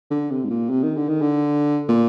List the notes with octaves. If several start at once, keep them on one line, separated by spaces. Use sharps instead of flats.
D3
C3
G#2
A#2
C3
D#3
D3
D#3
D3
A#2